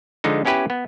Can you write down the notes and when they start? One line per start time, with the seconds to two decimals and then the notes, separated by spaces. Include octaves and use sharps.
0.24 D3 F3 G#3 D#4
0.45 B3 C#4 E4 G4 B4 G#5
0.70 B3